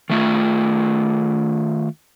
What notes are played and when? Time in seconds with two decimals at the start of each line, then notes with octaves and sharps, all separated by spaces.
0.10 D#3 A3 F4